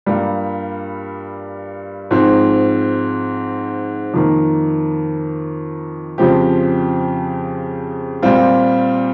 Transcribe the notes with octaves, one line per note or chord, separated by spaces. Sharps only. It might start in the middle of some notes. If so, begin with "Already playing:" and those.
G2 G3 A#3 F4
G#2 F3 C4
F2 D#3 A#3
F2 C#3 F3 C4 G4
A#2 G3 C4 F4